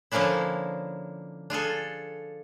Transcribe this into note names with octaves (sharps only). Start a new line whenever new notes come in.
D3 F3 A#3 C#4 D4 E4
D4 F4 G#4 A4